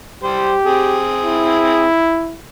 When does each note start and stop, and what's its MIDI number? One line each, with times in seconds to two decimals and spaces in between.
0.23 0.53 55
0.23 1.03 67
0.23 0.53 72
0.66 1.86 60
0.66 1.86 68
1.25 2.36 64